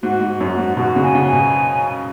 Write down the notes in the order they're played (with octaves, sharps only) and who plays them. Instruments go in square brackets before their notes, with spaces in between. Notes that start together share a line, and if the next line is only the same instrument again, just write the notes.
[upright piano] G#2 [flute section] F#4
[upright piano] G#2
[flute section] F#4
[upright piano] F#2
[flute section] F#4
[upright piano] G#2
[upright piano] B2 [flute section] F#4
[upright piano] C#3
[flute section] G#5
[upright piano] C#3
[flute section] G#5
[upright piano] B2